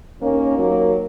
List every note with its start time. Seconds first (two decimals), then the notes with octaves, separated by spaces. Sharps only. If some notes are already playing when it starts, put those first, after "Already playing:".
0.20 D#2 D#3 A#3 C#4
0.58 F#3 A#3